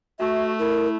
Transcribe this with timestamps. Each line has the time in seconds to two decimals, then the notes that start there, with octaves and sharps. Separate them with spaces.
0.19 A3 F#4 E5
0.59 E4 A#4